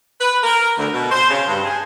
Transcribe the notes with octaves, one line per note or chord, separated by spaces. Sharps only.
B4
A#4
D2
B2
C5
C#3
G2
G#4